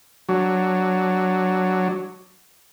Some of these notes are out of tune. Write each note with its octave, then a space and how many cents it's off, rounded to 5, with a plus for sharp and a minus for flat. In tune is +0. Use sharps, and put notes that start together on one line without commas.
F#3 +0 D4 +0